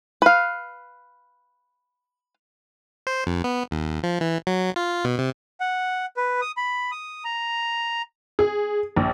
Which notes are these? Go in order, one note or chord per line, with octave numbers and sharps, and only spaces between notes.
B4 F5
C5
F2
B3
D#2
F3
E3
F#3
F4
B2
C3
F#5
B4
D#6
B5
D#6
A#5
G#4
A#1